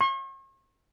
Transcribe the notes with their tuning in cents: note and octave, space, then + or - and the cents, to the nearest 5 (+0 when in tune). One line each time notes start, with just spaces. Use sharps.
C#6 -45